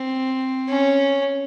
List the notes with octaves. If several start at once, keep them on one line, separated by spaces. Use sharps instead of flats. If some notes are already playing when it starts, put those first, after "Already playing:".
Already playing: C4
C#4